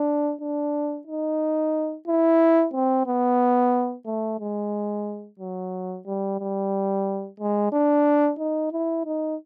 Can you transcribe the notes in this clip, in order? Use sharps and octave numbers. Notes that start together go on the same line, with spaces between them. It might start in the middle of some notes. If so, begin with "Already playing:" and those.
Already playing: D4
D4
D#4
E4
C4
B3
A3
G#3
F#3
G3
G3
G#3
D4
D#4
E4
D#4